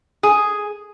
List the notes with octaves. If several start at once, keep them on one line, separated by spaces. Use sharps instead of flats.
G#4